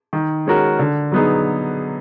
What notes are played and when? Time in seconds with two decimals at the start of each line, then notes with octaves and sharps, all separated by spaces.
0.13 D#3
0.46 G#3 C#4 F#4 A#4
0.79 D3
1.12 F#3 B3 D#4 G#4